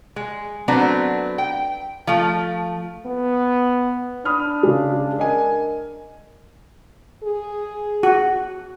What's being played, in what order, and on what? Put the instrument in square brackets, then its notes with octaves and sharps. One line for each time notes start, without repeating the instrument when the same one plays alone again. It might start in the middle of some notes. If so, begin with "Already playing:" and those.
[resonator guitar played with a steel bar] G#3
F#3 A3 B3 C4 D4
G5
F3 A3
[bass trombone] B3
[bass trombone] D4 [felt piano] B5 D#6 F6
[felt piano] C#3 G#3
A#4 D#5 G#5
[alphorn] G#4
[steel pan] F#4